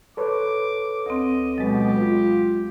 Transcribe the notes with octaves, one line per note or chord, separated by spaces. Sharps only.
A4 B4 C#5 D6
D2 C4 D#5
B2 F#3 G#3 G4
F4